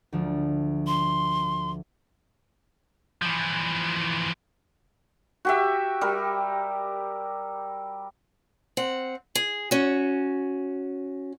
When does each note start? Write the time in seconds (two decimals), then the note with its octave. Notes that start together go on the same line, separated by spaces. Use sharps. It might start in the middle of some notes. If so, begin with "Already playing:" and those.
0.13 D2 F3 G#3
0.87 C6
3.22 E3 F3
5.45 F#4 G4 E5
6.01 G3 A#4
8.77 C4 F#5
9.35 G#4
9.71 C#4 F#4